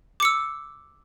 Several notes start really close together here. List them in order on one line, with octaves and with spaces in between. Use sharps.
D6 C#7 E6